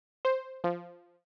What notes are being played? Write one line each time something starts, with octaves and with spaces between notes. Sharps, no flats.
C5
F3